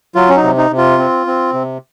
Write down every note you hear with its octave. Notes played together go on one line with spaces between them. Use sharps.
F#3 F4
C#4
D#4
C3
D#4
C3
F4
C4
C4
C3